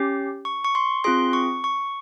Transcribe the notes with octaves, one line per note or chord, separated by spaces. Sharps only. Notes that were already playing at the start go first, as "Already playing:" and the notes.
Already playing: C#4 G4
C#6
C#6
C6
C4 F4 G#4 C6
C#6
C#6